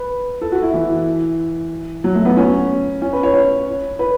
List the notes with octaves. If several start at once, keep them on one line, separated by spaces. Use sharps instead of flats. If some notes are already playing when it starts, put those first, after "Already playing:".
Already playing: B4
A4
F#4
E4
E3
F#3
A3
B3
C#4
C#4
B4
C#5
C#5
B4